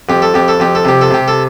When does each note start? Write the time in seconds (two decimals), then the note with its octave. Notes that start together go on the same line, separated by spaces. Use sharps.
0.09 F2 G4
0.22 A4
0.34 F2 G4
0.48 A4
0.60 F2 G4
0.75 A4
0.85 C3 G4
1.01 A4
1.10 C3 G4
1.28 A4